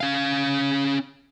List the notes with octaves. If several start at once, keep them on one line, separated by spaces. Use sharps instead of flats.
C#4 F5